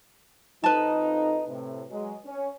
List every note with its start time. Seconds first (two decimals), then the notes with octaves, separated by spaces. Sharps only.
0.64 F2 D#4 B4 A5
1.48 A2 C3
1.91 F#3 G#3
2.26 C#4